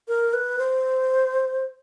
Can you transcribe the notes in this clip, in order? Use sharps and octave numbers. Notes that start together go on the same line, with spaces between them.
A#4
B4
C5